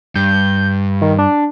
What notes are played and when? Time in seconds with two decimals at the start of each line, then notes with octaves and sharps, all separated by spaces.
0.15 G2 G6
1.02 D#3
1.18 D4